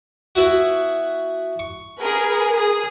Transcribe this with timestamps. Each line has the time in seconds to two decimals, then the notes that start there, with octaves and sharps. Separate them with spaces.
0.35 B3 E4 F#4
1.59 C#6
2.00 G#4 A#4 B4
2.55 G#4